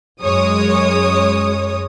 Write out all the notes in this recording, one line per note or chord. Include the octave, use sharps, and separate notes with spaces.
F#2 G#3 C#5 D#6